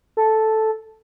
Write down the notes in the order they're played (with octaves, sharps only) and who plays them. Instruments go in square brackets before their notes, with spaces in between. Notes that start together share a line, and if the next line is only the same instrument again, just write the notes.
[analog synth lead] A4